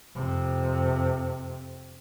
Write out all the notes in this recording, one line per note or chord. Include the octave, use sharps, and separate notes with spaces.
F2 C3